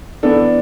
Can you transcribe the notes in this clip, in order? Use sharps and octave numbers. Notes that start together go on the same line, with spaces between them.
E3 B3 D4 A4